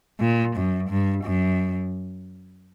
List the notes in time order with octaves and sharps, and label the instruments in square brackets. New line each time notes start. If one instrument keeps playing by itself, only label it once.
[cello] A#2
F#2
G2
F#2